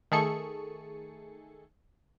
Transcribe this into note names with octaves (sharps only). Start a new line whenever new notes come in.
D#3 A3 G#4 A4 C#6 C#7